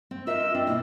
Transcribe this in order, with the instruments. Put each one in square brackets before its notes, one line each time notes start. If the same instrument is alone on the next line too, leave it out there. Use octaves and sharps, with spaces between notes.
[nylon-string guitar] C4
[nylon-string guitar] F4 A#4 E5 [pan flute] D#5 [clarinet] E6
[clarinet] C4 [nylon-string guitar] D4
[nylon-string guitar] B2 A#3 [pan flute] E4